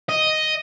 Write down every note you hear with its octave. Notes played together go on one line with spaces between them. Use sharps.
D#5